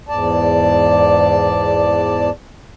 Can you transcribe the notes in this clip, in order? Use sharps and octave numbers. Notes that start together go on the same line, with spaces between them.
E2 G#2 D5 A5